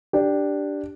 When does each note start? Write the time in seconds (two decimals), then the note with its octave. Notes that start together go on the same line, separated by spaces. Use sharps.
0.13 D4 G4